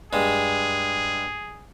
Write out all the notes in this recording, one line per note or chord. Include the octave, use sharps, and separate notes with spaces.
G2 G#3 G#4